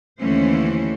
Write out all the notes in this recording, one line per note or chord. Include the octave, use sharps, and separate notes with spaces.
D#2 D3 E3 A3 C#4 C5